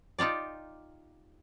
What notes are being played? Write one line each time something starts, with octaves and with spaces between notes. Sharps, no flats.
D#4 F4 G4 D5